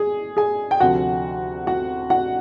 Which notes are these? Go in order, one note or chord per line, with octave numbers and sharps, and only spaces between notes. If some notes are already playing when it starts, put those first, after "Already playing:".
Already playing: G#4 G#5
G#4 G#5
G5
D2 C3 F3 F#4 F#5
F#4 F#5
F#4 F#5